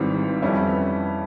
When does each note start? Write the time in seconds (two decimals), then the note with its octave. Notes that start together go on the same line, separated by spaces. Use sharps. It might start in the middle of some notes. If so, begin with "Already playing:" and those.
Already playing: G#1 G#2 E3 G3 C4
0.42 F2 E3 G3 C#4 E4